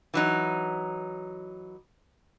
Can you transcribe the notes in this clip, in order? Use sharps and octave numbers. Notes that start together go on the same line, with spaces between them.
E3 F#3 D#4